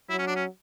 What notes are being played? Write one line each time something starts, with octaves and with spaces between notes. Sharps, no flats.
F#3 E4
C#4
D4
C#4